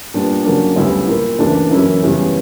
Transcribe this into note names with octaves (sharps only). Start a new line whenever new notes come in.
A#2 G3 B3 D4
C#3 F#3 A#3 D4
D2 C#3 G3 B3 E4
A#2 A#3 E4
D2 C#3 E3 A#3 D4
F#2 E3 A#3 C#4 E4
E2 C#3 E3 G3 C#4